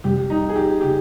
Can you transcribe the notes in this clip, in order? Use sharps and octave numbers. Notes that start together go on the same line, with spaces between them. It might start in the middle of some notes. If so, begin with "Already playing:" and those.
F2 C3 G3 G4
D#4
G#4
G4
C#3 G4